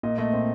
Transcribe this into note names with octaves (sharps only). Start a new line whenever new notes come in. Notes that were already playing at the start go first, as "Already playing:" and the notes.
A#2 D#5
A3 D#5
C4